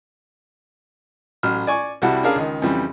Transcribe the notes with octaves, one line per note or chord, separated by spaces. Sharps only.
A1 F#3 F6
D5 G#5 C#6
C2 G3 E4 F#4 F#5 A5
C#4 D4 G#4 A#4 F5 A5
C#2 D#3
F2 C#3 E3 G3